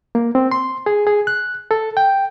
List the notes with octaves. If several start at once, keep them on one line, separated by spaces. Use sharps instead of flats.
A#3
C4
C6
G#4
G#4
F#6
A4
G5